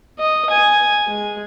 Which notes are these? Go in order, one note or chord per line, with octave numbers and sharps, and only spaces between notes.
D#5
G#5
G#3